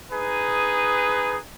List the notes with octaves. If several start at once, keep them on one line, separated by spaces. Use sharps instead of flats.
D#4 G#4 B4